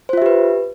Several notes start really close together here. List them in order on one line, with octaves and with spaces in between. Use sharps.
C5 F4 E5 G4 B4